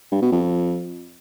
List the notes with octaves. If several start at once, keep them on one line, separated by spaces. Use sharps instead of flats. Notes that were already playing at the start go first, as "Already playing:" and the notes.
G2
B2
F2